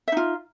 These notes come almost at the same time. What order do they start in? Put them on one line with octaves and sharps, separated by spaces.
E5 D#4 F4